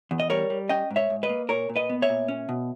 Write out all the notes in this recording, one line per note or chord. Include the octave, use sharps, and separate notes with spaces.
E2
D#5
G3 A#4 C#5
G3
C#4 D#5 G5
G#2
C#5 E5
G#2
B4 D#5
A#3
A#2 A#4 C#5
A#2
B4 D#5
B3
C#5 E5
A#2
C#4
B2